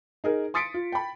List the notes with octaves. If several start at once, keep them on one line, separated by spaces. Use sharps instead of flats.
D#4 G#4 A#4
C6 D#6 A6 B6 C#7 D7
F4
G5 B5